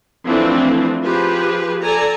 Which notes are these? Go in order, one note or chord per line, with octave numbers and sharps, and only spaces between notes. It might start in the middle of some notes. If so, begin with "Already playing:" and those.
E3 F3 A3 C4 D4
F3 G4 G#4 B4
A4 D5 G#5 A#5